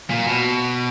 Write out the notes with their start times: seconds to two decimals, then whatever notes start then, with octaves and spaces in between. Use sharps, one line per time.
0.10 A#2
0.27 B2